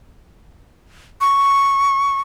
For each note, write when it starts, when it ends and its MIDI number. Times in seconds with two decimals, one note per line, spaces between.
1.21 2.21 85